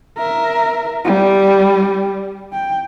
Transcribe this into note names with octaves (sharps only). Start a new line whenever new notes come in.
A#4 E5
G3
G5